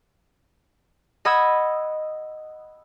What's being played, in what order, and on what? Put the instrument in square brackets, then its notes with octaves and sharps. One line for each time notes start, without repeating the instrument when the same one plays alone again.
[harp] D#5 F#5 B5 D#6 E6 G#6